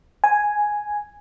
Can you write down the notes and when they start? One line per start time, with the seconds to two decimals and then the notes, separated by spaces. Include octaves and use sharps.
0.24 G#5